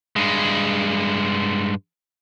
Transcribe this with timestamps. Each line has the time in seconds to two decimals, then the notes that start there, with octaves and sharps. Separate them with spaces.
0.16 G2 G#3